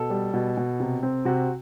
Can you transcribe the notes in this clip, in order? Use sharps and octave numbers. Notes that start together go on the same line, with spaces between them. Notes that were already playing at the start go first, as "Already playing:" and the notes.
Already playing: B2 A4
G3
B2
B2
C3
C4
C3 F#4